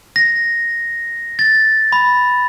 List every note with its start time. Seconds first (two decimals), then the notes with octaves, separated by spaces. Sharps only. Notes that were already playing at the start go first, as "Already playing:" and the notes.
0.16 A#6
1.39 A6
1.92 B5